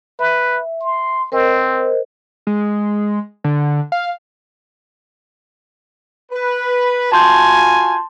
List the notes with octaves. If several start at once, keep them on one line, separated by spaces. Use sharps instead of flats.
B4 E5
C6
C4 A#4 C5 D#5
G#3
D3
F5
B4
F4 F#4 G#5 A5 C6 G6